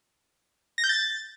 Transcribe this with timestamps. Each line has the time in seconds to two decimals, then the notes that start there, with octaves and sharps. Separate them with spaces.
0.78 A#6
0.84 G6
0.89 A6